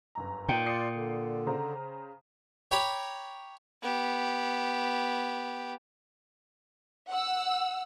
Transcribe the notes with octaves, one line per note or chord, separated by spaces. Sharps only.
G1 F#2 A#5
A#2 D#4 G5
F4 D5 D#6 C7 C#7
D3
C#3 C5 A#5
C#5 G5 A#5 B5 D6
B3 G4
F#5 E6